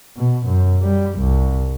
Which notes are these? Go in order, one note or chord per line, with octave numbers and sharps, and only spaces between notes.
B2
F#2
G3
C2